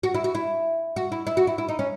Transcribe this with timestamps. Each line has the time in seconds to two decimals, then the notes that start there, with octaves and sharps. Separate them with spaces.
0.03 F#4
0.14 E4
0.24 F#4
0.35 E4
0.96 F#4
1.12 E4
1.27 E4
1.37 F#4
1.47 E4
1.58 E4
1.68 D#4
1.79 C#4